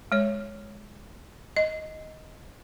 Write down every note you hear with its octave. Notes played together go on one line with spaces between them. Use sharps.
G#3 C#5
D#5